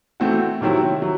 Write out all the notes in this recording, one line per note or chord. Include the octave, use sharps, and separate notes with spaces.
E3 A3 C4 F#4
C3 D#3 F#3 C4 E4
F#3